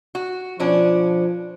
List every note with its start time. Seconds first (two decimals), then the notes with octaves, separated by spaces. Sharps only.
0.15 F#4
0.60 B2 F3 C#4 D4